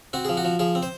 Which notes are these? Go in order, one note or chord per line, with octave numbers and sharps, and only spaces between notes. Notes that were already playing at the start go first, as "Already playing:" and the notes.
C4 F#4
F3 G#4
F#4
F3
F3 G#4
C4
C5